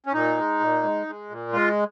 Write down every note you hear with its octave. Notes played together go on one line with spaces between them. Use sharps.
C#4
A#2 D#4
G#3
A#2
G#3
G#3
A#2
G#3 F4